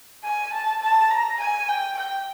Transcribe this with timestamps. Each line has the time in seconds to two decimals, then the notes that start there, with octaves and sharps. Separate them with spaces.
0.24 G#5
0.53 A5
0.82 A5
1.11 A#5
1.40 G#5
1.68 G5
1.97 G5